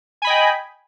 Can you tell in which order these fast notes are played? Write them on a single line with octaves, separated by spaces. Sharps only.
G#5 B5 D#5 G5